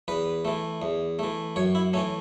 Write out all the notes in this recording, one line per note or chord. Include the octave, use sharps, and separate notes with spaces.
E2 B4
E3 A3
E2
E3 A3
F#2 C#5
E4
E3 A3 C#4